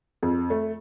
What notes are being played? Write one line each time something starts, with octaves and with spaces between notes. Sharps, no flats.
F2
A3